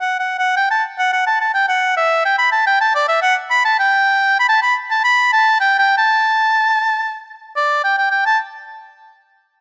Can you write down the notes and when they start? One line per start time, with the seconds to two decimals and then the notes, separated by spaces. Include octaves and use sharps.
0.01 F#5
0.19 F#5
0.39 F#5
0.57 G5
0.71 A5
0.98 F#5
1.13 F#5
1.26 A5
1.41 A5
1.54 G5
1.69 F#5
1.97 E5
2.25 G5
2.38 B5
2.52 A5
2.66 G5
2.81 A5
2.95 D5
3.09 E5
3.22 F#5
3.51 B5
3.65 A5
3.79 G5
4.40 B5
4.49 A5
4.62 B5
4.91 A5
5.04 B5
5.32 A5
5.60 G5
5.78 G5
5.98 A5
7.56 D5
7.84 G5
7.98 G5
8.11 G5
8.26 A5